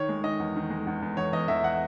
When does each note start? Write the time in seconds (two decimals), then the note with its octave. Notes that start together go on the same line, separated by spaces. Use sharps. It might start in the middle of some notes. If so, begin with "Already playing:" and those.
Already playing: D#3 C#5
0.09 G#3
0.24 D#3 D#5
0.40 E2
0.56 D#3
0.70 G#3
0.87 E2
1.02 E2
1.17 E2 C#5
1.33 E2 D#5
1.48 E2 E5
1.64 F#5